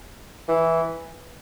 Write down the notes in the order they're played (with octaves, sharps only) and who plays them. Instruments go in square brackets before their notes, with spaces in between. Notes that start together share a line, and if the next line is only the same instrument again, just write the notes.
[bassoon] E3